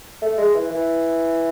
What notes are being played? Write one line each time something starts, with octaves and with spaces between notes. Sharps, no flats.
A3
G#3
E3
E3